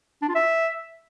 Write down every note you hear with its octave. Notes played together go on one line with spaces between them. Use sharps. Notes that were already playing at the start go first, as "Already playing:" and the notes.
D4
F4
E5